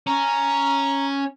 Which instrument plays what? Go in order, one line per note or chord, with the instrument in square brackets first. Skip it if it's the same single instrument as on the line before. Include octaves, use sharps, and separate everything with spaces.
[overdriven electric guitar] C#4 [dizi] A#5